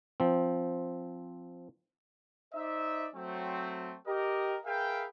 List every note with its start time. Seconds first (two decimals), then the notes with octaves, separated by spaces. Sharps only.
0.20 F3 C4
2.54 D#4 C5 D5 E5
3.15 F#3 A3 C4
4.07 G4 A#4 D#5
4.65 G#4 A#4 B4 E5 F5 G5